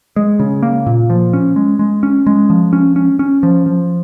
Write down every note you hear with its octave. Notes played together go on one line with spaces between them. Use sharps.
G#3
C#3
A#3
A#2
F3
C#4
G#3
G#3
C#4
G#3
F3
C#4
C#4
C#4
F3
F3